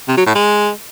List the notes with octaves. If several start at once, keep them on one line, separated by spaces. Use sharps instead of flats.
C3
F#3
A2
G#3